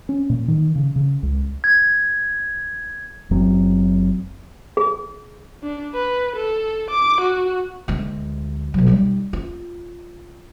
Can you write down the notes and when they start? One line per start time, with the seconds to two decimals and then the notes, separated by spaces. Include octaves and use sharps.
0.09 C#4
0.30 A#2
0.48 D#3
0.76 C#3
0.96 C#3
1.23 C#2
1.64 G#6
3.31 F#1 F#2 F#3 C4
4.77 G#4
5.63 D4
5.94 B4
6.36 A4
6.91 D6
7.21 F#4
7.88 D2 G#3
8.74 B2 F#3
8.87 G3 D#4
9.33 F4